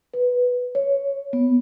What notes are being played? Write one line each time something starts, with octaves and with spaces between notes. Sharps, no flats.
B4
C#5
B3